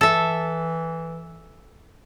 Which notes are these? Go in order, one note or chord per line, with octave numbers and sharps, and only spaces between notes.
E3 A4 E5